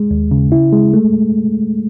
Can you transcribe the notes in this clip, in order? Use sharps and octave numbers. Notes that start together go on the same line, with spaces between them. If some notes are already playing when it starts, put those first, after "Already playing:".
Already playing: G#3
D#2
C#3
E4
G#3
A3